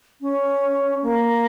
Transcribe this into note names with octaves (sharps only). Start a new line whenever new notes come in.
C#4
A#3